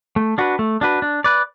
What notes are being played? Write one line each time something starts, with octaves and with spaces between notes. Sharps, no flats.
A3
D4 F#4 B4
A3
D4 F#4 B4
D4
B4 D5